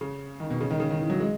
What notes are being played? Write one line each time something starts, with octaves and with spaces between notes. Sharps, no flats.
C#3
D#3
B2
C#3
D#3
C#3
D#3
E3
F#3
G#3